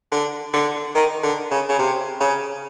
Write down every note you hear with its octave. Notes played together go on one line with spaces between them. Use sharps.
D3
D3
D#3
D3
C#3
C#3
C3
C#3